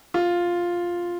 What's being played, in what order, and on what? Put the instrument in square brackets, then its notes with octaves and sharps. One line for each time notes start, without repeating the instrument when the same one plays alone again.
[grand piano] F4